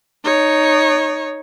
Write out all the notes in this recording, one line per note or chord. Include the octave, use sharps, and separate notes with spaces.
D#4 C#5